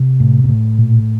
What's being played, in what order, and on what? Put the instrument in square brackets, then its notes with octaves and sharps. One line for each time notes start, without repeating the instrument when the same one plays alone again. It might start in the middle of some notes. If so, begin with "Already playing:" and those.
Already playing: [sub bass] C3
[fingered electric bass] A2
A#2
A2
[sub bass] A#2